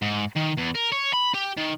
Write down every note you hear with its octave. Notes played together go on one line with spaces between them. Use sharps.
G#2
D#3
E2
A#4
C#5
B5
G4
D#3